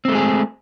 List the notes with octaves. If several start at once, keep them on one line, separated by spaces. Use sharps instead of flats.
G#3 A3 C4 G#4